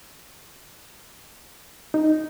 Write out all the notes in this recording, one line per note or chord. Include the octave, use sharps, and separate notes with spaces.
D#4